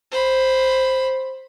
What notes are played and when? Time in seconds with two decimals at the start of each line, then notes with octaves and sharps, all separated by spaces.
0.11 C5 B5